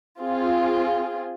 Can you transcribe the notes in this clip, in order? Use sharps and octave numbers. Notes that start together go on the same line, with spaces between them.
C4 F4 G#4